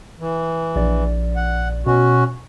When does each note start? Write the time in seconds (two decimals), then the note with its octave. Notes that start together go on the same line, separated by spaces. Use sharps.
0.20 E3
0.76 A#1 D5
1.36 F#5
1.86 B2 C#4 F#4